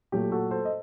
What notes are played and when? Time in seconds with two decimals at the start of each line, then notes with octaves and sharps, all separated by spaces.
0.12 A#2 F#3 A3 G4
0.32 F#4 A4
0.51 A4 C5
0.65 D#5